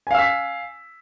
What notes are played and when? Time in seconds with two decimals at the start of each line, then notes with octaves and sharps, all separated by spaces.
0.07 G#5
0.11 F5
0.15 E6
0.19 B6